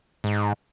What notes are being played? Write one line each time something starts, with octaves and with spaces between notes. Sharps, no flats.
G#2